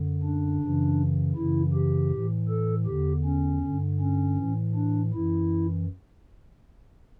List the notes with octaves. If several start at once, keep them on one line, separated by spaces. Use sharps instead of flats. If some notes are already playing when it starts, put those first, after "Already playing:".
Already playing: F#2 D3
D4
F#2 C#3 E3
F#2 C#3 E3 E4
G4
A2 E3
A4
E2 D3 G4
C#4
G2 D3
C#4
A2 E3
D4
F#2 E3 E4